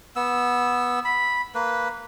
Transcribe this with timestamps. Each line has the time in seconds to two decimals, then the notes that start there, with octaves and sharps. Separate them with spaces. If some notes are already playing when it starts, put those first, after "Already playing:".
0.16 B3 E6
1.05 B5
1.55 A#3 B4